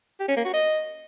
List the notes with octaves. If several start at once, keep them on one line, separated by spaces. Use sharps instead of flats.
G4
C#4
A#3
F#4
D#5